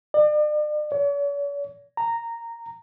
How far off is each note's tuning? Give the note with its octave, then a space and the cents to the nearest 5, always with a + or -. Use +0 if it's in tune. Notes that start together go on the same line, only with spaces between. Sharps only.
D5 +40
C#5 +45
A#5 -10